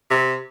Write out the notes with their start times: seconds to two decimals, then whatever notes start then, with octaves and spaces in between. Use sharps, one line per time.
0.10 C3